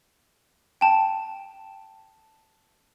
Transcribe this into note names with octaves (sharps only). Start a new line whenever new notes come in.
G5 A5